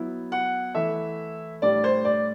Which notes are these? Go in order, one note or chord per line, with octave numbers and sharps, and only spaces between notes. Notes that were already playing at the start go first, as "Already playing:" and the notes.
Already playing: F#3 B3 E4
F#5
E3 A3 E4 E5
A2 G3 D4 D5
C5
D5